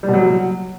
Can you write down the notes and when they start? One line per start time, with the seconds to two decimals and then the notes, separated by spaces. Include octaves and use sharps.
0.03 G3
0.08 B2
0.14 F#3